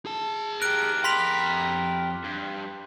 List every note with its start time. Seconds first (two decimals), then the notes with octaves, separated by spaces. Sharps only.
0.06 G#4 A5
0.62 G4 A#4 F#6 D7
1.04 F2 B5 C6 B6 F7
2.24 G2